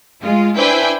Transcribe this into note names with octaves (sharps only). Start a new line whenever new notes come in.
G#3 F4
D4 E4 B4 C5 G5 G#5